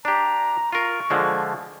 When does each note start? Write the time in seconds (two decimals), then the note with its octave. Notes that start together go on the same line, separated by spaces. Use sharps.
0.05 D4 G4 A#5
0.73 F4 A#4 C#6
1.10 D3 F3 G#3